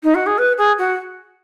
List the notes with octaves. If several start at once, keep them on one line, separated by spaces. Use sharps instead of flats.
D#4
F#4
G#4
B4
G#4
F#4